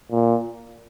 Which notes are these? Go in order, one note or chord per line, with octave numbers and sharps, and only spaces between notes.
A#2